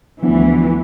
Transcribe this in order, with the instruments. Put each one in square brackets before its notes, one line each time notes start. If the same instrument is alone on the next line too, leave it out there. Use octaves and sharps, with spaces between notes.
[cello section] D2 E3 [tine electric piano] F3 B3 D4